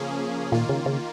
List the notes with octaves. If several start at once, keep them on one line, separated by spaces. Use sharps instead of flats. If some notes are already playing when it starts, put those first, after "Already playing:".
Already playing: C#3 F3 A#3 C#4 G#4
A#2 D#3 A#3 F4
C#3
C#3